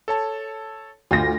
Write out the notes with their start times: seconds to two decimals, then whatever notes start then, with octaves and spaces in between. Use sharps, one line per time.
0.08 A4 C#5 A5
1.11 D2 F4 G6 A#6